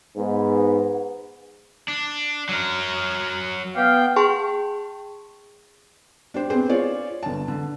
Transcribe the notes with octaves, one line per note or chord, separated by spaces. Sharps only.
G#2 B3
D4
F#3 A#4
B3 F5 G5
G#4 G5 A5 C6 C#6
D4 G4 C5
B3 C4 G#4 C5
F4 G#4 C#5 D5
G1 A5
D3